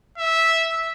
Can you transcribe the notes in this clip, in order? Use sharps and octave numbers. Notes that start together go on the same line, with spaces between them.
E5